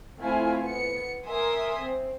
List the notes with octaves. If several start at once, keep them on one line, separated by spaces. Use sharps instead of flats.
A3 C4 E4 F4 G#5
B3 C#7
A#4 E5 G#5 C6 D#6
C4